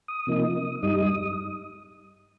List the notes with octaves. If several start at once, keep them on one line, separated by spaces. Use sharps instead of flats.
D#6
C3 F3 A#3 D#4
G2 G3 D#4 D#6